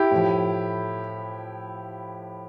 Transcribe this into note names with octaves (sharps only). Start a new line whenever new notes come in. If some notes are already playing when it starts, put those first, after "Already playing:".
Already playing: E4 G4
A2 F3